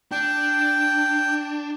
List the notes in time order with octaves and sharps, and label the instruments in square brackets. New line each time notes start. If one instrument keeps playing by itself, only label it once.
[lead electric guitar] D4 [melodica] G5